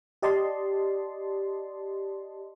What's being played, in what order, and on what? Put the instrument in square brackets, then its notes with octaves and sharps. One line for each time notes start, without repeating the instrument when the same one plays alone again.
[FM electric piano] G4 D5 D#5 A5 C6